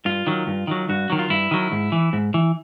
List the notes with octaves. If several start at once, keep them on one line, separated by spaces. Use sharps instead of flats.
G2 F4
D#3 F#3
G2
D#3 F#3
G2 F#4
D#3 F#3
F4
G2 E4
D#3 F#3
G#2
E3
G#2
E3